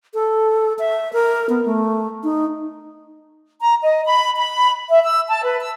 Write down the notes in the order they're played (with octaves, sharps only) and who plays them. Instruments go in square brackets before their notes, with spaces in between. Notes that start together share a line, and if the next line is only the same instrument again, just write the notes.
[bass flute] A4
E5
A#4
B3
A3
D#4
[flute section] A#5
D#5
B5
B5
E5
E6
A5
B4
E6